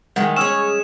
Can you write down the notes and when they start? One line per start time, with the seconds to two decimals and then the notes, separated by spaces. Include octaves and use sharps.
0.16 D#3 E3 G#3 F#5
0.36 C#4 G#4 C#5 C#6 E6 F6 E7